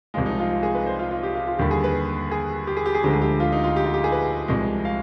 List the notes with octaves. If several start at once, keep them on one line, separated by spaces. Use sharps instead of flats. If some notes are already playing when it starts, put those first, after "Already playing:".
C2 C3 F3 G#3 F4
D#4
F4
F4
G#4
B4
C5
F4
F4
G4
F4
F4
D#2 D3 G3 G4
G#4
B4
G#4
G4
G#4
G4
G#4
D2 D3 F3 G#3 G4
G#4
G4
F4
D#4
F4
G4
F4
G4
G#4
B4
C2 C3 F3 G#3
F5